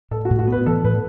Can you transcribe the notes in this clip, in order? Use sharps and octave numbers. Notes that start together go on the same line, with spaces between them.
A2 A4
F#4
A2
F#4
B3 B4
E3 A4
A2 B4